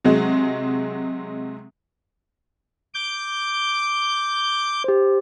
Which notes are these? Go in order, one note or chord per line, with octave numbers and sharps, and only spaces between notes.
C3 F#3 G#3
D6 G6
G4 C5